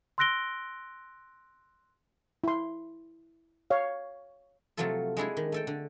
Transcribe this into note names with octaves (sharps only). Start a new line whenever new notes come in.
C6 E6 F#6 A#6 D7 G7
E4 C6
C#5 F5
C3 F3 F#3 A3 F4 A4
G#3 D4 E4 G#4
D#3
A3 A4 G5
D3